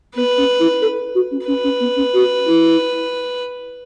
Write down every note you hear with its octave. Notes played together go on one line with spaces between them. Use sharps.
B3 B4
C#4
E4
A4
F#4
C#4
C#4 B4
C#4
B3
C#4
F#4
E4